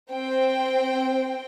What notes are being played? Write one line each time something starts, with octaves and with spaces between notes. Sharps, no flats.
C4 C5 G5